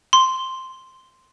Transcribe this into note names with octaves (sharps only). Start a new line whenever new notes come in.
C6